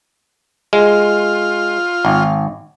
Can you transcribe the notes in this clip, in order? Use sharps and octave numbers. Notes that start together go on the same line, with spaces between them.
G#3 F4
G#1